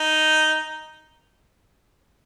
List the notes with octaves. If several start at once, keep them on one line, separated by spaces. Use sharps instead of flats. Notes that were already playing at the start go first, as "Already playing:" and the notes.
Already playing: D#4